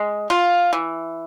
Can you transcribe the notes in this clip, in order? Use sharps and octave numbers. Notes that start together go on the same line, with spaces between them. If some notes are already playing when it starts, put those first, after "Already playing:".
Already playing: G#3
F4
E3